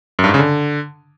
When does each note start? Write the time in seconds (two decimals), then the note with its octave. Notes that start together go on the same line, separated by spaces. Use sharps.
0.19 F#2
0.24 G2
0.29 G#2
0.34 C#3
0.39 D3